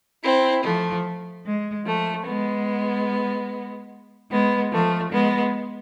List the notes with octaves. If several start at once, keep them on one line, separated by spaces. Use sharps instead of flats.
C4 E4
F3 A3
G#3
F3 A3
G#3 B3
G#3 B3
F3 A3
G#3 B3